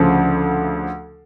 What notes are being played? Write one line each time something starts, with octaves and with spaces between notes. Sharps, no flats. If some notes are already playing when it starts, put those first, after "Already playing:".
Already playing: D2 C#3 F3